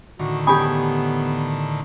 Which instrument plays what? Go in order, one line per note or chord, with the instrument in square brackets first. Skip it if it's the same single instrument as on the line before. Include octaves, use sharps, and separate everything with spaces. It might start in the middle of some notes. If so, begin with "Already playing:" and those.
[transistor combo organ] A2 D3 D#3 [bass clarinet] F#4
[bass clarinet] B3 [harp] G4 C#5 G#5 [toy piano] A5 B5 D#6